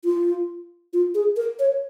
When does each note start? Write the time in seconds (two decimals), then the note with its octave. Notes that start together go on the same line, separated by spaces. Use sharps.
0.05 F4
0.93 F4
1.15 G#4
1.37 A#4
1.60 C#5